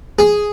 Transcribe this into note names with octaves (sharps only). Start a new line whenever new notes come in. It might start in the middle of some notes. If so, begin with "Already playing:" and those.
G#4